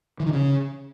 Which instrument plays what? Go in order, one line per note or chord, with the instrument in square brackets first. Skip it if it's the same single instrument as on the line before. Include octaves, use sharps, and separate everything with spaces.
[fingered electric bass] E3
D#3
C#3